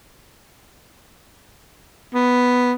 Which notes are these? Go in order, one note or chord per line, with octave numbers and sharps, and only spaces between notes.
B3